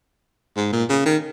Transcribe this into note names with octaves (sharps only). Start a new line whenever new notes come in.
G#2
A#2
C#3
D#3